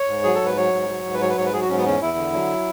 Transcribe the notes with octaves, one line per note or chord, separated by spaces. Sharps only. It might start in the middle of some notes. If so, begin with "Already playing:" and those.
Already playing: C#5
G#2
F#3 G#4
A4
G#2 B4
F#3 C#5
G#2
F#3
G#2
B4
F#3 C#5
B4
G#2 C#5
B4
F#3 G#4
F#4
G#2 C#4
B3
E2 C#4
E2 E4
D3
F#3